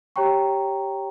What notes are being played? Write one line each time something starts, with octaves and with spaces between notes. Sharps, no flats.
G4 C#5 G5 A#5 C#6